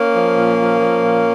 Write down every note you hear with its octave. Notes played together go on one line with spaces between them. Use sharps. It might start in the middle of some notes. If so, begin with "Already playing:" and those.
Already playing: A#3 C#4
F3
A#2
F3
F3
A#2